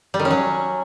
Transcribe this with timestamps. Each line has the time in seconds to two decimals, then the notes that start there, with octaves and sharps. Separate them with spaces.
0.14 G3
0.19 D#3
0.25 C#4
0.31 F#3